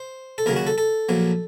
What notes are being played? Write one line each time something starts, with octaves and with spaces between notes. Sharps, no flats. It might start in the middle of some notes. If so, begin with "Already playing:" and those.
Already playing: C5
A4
D#2 C#3 F#3 A#4
F#4
A4
A4
A#1 A#2 F#3